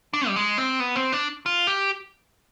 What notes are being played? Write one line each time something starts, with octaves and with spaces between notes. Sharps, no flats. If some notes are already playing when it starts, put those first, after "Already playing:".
D4
G3
G#3
C4
B3
C4
D4
F4
G4